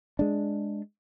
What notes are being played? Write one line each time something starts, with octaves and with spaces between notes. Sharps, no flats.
G#3 D4